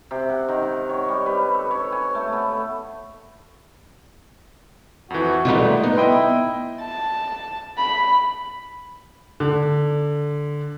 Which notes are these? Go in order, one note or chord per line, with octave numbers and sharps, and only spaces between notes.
C3
F#5
D#3
F#5
C#5
G3
B4
A4
C#5
G#5
A3
B3
F2 E3 F#4
G#2 C3 D#3 G3 A3 B3 D#4 F4
B3 D#4
E4 D#5 G5 C6
A5
B5
D3